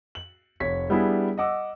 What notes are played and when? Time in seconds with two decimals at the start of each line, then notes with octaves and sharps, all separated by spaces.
0.15 F#7
0.60 F1 C#5 B6
0.90 G3 B3 D4 E4 G#4
1.38 D#5 F#5 D6 E6